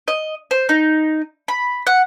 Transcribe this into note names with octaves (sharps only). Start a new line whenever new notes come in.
D#5
C5
D#4
B5
F#5